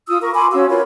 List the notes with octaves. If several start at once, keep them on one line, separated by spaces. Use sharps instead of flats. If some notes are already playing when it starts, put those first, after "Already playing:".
F4 D#6 E6
A#4 C#6
G#5 B5 C6 D6
C#4 F#4 F5 E6
F4 A#4 B4 C#5